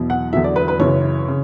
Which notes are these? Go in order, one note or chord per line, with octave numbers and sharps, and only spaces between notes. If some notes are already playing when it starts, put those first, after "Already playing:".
Already playing: E2 B2 F#3
F#5
E2 D3 F#3 E5
D5
B4
B4
F#2 C#3 E3 C#5
C#3